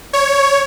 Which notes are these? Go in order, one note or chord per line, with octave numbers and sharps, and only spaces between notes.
C#5